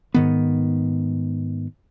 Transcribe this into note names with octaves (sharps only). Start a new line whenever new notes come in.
G#2 D#3 B3